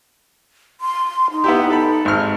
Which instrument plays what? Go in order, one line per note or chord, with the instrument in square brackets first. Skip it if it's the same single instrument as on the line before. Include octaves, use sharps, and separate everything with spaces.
[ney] C6
D#4
[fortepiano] B3 E4 G4
A4 B5
G#1 F6